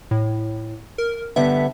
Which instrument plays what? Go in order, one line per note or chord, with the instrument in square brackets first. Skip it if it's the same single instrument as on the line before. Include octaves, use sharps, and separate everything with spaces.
[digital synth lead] A2
A#4
[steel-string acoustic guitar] G2 D3 B3 [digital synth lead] E5